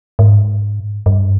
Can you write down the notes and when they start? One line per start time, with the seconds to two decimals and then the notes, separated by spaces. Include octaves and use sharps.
0.19 G#2
1.06 G2